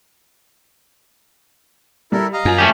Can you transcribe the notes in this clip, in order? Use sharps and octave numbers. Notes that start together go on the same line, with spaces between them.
G3 E4 A4 A#4
D#5 F5 A#5
F#2 F4 G#5 F7
A3 C#4 G4